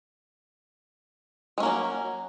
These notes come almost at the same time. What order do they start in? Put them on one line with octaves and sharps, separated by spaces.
G#3 C#4 A#3 F#3